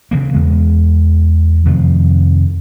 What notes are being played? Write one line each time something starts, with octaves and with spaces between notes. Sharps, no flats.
C#3 E3 A#3
E2 G#3 B3
F2 C3 D#3 F3